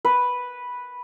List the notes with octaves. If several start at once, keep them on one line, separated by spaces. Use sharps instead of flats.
B4